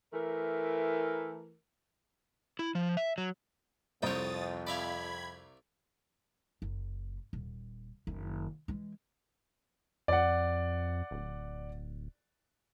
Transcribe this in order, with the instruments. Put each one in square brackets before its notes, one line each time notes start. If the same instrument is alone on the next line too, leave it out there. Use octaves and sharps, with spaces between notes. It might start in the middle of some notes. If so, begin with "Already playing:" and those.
[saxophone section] E3 A3 A#4
[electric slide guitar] E4
F3
E5
F#3
[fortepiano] C2 C4 [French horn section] F2 [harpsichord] C#5 G5 [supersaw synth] D#6 A6
[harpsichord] D5 E5 F5 [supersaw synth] B5 G#6
[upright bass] F#1
D#1
F#1 D#3
E3 G#3
[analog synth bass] F2 [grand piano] D5 F#5
[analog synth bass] D1